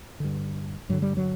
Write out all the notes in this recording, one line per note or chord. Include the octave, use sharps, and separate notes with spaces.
G2 D3
G2 D3 F#3
G3
F#3